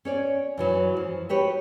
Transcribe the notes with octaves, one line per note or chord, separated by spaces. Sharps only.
C#4 C#5 D5
F#2 E3 F#3
F3
F#4 G4 B4 C#5